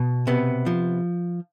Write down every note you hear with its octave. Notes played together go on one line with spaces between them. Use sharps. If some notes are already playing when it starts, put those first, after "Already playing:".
Already playing: B2
C3 B3
F3